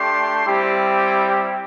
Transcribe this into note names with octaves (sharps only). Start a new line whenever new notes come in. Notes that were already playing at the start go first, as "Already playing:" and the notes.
Already playing: A3 D4 G4 C6
G3 C4 E4 G4